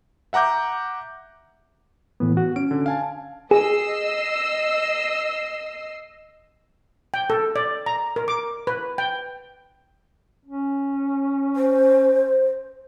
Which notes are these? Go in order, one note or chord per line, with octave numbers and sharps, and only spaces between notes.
E5 F#5 A#5 D6 G6
A2 E3 B3
F#4
C#4 D7
D3
F5 G#5 A5
G#4 D#5 E6 C7
G5
A4
D5
A#5
A#4
D6
B4
G5
C#4
C5